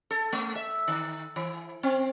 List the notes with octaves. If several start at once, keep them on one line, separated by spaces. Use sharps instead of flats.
A4
A3
E5
D#3
E3
C4